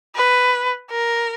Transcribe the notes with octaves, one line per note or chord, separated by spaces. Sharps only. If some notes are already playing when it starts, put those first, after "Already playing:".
B4
A#4